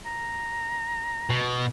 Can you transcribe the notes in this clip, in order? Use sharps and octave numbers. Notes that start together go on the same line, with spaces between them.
A#5
B2